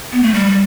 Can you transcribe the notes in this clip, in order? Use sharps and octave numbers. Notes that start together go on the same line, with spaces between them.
B3
A3
G3
G3